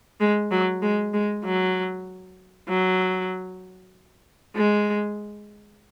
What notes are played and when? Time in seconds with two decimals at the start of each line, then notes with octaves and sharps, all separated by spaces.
0.20 G#3
0.51 F#3
0.82 G#3
1.14 G#3
1.45 F#3
2.69 F#3
4.56 G#3